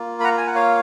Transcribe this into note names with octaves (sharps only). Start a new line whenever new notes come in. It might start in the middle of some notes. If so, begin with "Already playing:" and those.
Already playing: A#3 F4
B5
F#5 A#5
G#5
F#5
C#5 F5